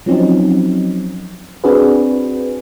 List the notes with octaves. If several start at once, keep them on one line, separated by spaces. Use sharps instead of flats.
F3 F#3 C4 C#4 D#4
C4 D4 F#4 G#4 B4